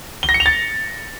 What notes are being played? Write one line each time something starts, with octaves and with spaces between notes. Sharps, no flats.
G7
A#6
C#7
F7
A6